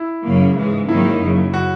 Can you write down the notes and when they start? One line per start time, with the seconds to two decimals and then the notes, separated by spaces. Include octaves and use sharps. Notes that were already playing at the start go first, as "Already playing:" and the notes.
Already playing: E4
0.24 F#2 C#3 F#3 A#3
0.56 G#2 E3 G#3
0.89 G#2 D#3 F#3 A#3 D#4 E4
1.22 F#2 C#3 F#3
1.54 F#4